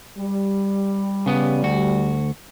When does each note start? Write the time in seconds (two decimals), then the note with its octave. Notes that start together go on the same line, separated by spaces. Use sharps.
0.18 G3
1.26 C#3 B3
1.63 D2 F#4